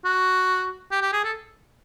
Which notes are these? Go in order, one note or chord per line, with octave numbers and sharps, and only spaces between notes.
F#4
G4
G4
G#4
A4